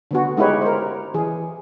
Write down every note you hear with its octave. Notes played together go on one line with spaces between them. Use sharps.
D3 B3 F#4
G#3 D#4 E4 G4 B4 C#5
A#4 C5
E3 G#4